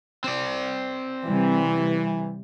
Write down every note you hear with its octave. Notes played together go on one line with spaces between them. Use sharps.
C4 D5
C3 E3 G3